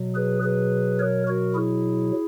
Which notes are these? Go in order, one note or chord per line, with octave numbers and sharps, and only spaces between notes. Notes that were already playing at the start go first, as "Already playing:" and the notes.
Already playing: B2 F#3
G#4 B4
G#4 B4
A#4 C#5
F#4 A#4
E4 G#4